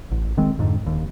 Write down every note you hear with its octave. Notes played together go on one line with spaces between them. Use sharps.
A1
D1 D#3 G#3 C4
F2 G#2 D3
D#1 D#2